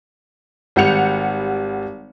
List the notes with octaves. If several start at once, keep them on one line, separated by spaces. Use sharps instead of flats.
G#1 G3 F#5 G6 C#7 F7